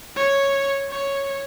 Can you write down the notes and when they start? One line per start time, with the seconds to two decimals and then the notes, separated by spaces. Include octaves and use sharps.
0.16 C#5
0.90 C#5